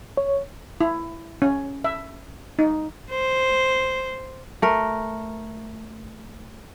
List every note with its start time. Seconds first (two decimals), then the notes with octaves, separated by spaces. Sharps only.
0.17 C#5
0.81 E4
1.42 C#4
1.84 E5
2.59 D#4
3.11 C5
4.62 A3 A#4